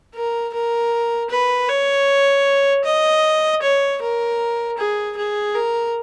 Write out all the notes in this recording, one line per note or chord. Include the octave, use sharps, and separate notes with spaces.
A#4
A#4
B4
C#5
D#5
C#5
A#4
G#4
G#4
A#4